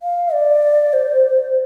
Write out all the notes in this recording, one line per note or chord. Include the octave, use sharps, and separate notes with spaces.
F5
D5
C5